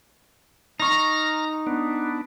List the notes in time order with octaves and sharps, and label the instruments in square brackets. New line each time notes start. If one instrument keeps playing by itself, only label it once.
[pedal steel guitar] D#4 C#6 [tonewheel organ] A#5 F6 A#6
[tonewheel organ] B3 D4